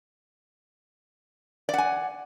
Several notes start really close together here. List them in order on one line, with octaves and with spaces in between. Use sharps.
D5 F#5 G#5